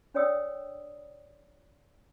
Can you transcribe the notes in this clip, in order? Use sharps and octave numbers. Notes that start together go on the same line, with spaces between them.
D4 C#5 D5 G5 D#6 E6